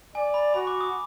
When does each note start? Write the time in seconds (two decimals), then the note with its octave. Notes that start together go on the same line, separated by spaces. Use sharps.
0.15 D5 G#5
0.34 B5
0.54 F#4 B5
0.67 D6
0.81 D#6